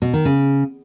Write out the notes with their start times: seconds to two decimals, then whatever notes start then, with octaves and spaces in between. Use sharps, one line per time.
0.02 B2
0.13 D#3
0.25 C#3